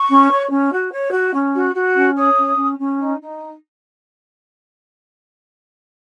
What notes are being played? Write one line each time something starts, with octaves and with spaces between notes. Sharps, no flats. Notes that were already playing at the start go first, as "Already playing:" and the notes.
Already playing: C#6
C#4
C#5
C#4
F#4
C#5
F#4
C#4
F#4
F#4
C#4
C#5 D#6
C#4
C#4
C#4
D#4
D#4